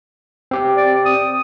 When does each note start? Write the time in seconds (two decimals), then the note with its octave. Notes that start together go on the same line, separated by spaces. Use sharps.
0.51 C4 G4 G5
0.77 D5
1.05 D#6